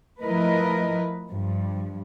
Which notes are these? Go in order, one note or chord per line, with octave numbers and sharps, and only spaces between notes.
F3 A3 E4 A#4 B4 D#5
G2 F3